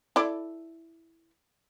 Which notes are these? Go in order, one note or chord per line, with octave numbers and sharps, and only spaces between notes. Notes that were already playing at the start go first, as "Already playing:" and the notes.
E4 A4 D5